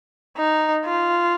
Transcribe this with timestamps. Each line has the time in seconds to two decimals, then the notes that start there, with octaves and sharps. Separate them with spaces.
0.38 D#4
0.86 F4